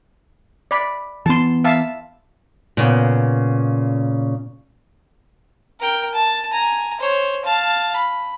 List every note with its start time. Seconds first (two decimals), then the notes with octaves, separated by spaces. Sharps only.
0.71 D5 B5
1.26 E3 B3 A5 C6
1.64 E5 F5 A5
2.77 A#2 C#3 B3
5.80 A#4 G5
6.15 A5
6.52 G#5 A#5
7.00 C5 C#5
7.45 F5 A5
7.96 B5